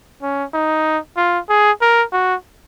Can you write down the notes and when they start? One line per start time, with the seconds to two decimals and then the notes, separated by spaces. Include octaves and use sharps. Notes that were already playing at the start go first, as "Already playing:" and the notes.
0.22 C#4
0.54 D#4
1.17 F4
1.49 G#4
1.82 A#4
2.13 F#4